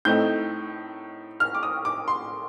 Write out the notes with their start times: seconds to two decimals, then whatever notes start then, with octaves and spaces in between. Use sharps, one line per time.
0.05 A2 A3 C4 D#4 G6
1.40 F6
1.55 D6
1.63 D#6
1.85 D6
2.08 C6